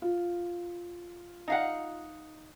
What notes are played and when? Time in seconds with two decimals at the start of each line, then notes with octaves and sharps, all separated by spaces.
0.02 F4
1.48 D#4 F5 F#5